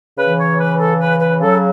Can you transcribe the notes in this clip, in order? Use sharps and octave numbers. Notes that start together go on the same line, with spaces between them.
C#3 E3 B4
C#5
B4
A4
B4
B4
C#3 F#3 A4